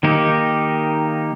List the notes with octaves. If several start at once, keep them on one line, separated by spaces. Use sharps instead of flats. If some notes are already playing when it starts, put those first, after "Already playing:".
D#3 A#3 D#4 G4